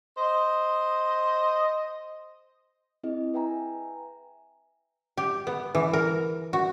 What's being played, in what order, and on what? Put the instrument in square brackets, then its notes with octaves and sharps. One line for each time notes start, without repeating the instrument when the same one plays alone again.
[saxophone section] C5 D#5
[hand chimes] C4 E4 G#4 D#5
B4 E5 G5 G#5 A#5
[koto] G4
B3
E3
A#4
F#4